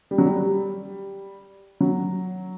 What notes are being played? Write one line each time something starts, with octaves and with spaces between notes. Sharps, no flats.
G3
F#3
G3
F#3